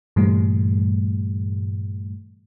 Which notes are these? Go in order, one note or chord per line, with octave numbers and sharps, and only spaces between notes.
G2 A#2 E3 G3 A3